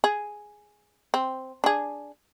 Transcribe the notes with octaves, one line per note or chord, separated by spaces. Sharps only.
G#4
C4
D4 G#4